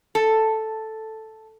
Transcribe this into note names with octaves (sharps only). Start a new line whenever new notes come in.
A4